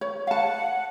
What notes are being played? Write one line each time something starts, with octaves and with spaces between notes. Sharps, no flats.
C#5
F5 F#5 A5